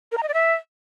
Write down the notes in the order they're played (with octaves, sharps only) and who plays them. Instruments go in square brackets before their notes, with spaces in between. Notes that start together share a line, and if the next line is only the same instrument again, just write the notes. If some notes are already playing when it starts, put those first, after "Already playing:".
[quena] A#4
A#5
D#5
D5
E5